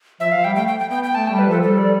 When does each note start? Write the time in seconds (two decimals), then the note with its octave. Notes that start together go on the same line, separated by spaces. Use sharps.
0.20 F3 E5
0.31 F3 F5
0.44 G3 G5
0.55 A3 G5
0.68 G5
0.80 G5
0.91 B3 G5
1.04 G5
1.15 A3 A5
1.27 G3 G5
1.39 B4
1.47 F3 A4
1.62 G3 A4
1.78 D5